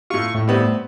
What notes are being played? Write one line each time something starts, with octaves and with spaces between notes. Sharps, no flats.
A2 F4 C#6
A2
G3 B3 C4